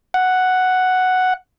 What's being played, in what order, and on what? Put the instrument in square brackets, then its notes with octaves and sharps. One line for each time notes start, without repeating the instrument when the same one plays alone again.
[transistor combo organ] F#5